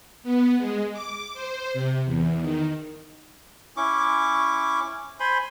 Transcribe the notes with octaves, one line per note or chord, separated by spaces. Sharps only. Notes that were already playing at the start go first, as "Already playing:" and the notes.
B3
G#3
D6
C5
C3
E2
D#3
C#4 E4 C#6 D6
C5 G#5 B5 C6